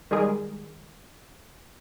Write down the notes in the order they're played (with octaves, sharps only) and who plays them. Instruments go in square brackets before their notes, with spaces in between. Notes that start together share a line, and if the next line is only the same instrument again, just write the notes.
[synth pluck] D#3 G3 G#3 G#4 A#4